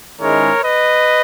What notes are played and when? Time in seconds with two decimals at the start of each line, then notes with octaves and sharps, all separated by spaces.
0.20 G#2 D#3 G#3 C#4 E4 A#4 C#5
0.64 B4 D#5